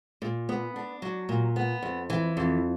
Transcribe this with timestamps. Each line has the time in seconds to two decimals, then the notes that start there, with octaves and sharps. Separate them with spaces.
0.22 A#2
0.49 B3
0.76 D4
1.02 F#3
1.29 A#2
1.56 B3
1.82 F2
2.10 E3
2.37 F2